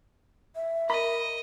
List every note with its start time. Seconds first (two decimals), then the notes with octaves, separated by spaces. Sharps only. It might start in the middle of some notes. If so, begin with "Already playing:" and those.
0.56 E5
0.90 A#4 D#5 B5